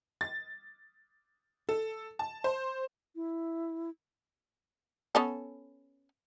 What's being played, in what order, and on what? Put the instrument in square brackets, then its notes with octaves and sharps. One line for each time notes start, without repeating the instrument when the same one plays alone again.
[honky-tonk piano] A6
A4
A5
C5
[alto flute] E4
[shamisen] B3 C#4 A4